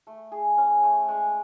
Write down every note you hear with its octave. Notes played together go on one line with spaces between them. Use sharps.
A3
G#4
C#4
A3
G#3